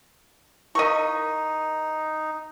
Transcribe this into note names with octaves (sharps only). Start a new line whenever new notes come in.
D#4 E4 A#4 D#5 F5 C#6